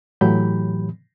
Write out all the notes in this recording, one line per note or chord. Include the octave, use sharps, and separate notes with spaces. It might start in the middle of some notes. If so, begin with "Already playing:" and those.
A2 E3 F#3 G4 B5 G6